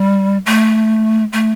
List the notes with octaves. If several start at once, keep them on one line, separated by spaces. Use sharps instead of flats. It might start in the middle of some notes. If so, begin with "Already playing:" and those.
Already playing: G3
A3
A3